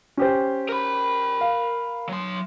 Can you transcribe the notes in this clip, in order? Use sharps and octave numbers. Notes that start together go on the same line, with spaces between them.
C#4 G4 C5
A#4 B5
F5
F#3 C6